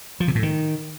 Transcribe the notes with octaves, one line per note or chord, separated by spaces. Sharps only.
F3
C3
A2
D#3